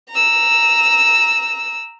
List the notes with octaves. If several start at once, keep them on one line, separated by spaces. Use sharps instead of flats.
A#5 E6